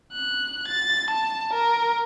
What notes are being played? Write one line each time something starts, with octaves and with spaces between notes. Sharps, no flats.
F#6
A6
A5
A#4